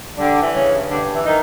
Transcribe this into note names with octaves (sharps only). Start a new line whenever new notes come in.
D3 G3 D4
E3
C#3 C#4
G2
G2 D3 D4
E3
D#3 D#4